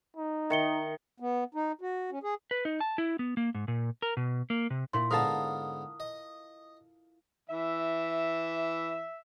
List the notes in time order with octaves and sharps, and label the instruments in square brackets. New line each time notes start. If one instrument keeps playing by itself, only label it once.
[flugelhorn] D#4
[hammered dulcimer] D#3 [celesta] E5 C#7 G7
[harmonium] B3
D#4
F#4
C#4
G#4
[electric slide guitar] B4
D#4
A5
E4
B3
A#3
G#2
A#2
A#4
B2
A#3
C3
[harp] A#2 E4 [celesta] C6
[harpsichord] G#2 D3 B3 [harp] A#4 F5 A5 [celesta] D#6
[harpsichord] D#5
[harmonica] E3 [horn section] E5